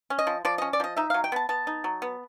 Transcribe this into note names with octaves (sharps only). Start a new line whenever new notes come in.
C#4
D#5
F3
F3 D5
C#4 D#5
D5
F3 D#5
D#4 E5
F5
F#3
G5
B3 A5
B3 A5
D#4
F#3
B3